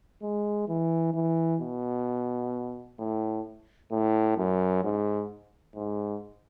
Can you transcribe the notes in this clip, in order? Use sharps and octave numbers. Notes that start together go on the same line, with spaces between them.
G#3
E3
E3
B2
A2
A2
F#2
G#2
G#2